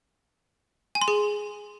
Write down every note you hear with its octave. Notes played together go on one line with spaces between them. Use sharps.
G#5
C6
G#4